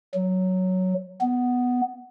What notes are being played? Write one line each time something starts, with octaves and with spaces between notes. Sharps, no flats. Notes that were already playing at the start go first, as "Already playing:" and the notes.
F#3
B3